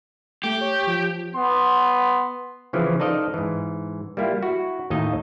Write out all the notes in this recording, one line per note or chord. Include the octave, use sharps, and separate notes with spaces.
A3 G4
C#5
F3
B3 C6
C#3 E3 F3 C4
D#4 A4 C5 D5 D#5 F5
G#2 E3
G3 A#3 E4 F4 G4
E4 F#4
D#2 A2 D#4 D#5 E5 A#5